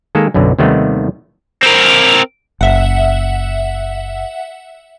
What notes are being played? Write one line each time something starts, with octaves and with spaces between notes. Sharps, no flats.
D#3 G#3 A#3 A4
B1 F#2 B2 D3
D#2 C3 D#3 G3 A3 B3
C4 A#4
F#1 E5 F#5